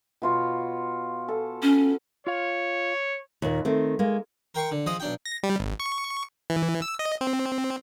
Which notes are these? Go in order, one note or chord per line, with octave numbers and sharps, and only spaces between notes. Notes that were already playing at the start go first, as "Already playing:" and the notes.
B2 F4 C#5
A4
C#4
F4 C#5 F5
D#2 A#2
D#3 A3 C4
G#3 A#3
A#4 G5 C6 C#6
D3
F3 G#3 D#5 D#6
B1 D4 G5
A#6
G3
G#1
C#6
E3
E6
D#5
C4